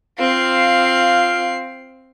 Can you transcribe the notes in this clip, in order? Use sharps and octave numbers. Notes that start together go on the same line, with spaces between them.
C4 F4 F5 C7